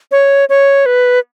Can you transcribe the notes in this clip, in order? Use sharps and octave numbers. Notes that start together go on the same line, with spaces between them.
C#5
C#5
B4